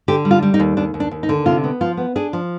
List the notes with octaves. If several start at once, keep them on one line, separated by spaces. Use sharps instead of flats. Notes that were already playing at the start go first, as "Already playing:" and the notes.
D3 G4
G3
F4
G3
D#4
D#2
D#2 D4
D#2
D4
D#2
D#4
D3
C3 F4
B3
F3 F4
B3
D4 G#4
F3